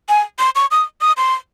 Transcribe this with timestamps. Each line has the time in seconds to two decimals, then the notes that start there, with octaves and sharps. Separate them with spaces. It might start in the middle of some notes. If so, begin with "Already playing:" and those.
0.09 G#5
0.39 C6
0.55 C#6
0.71 D#6
1.01 D#6
1.17 C6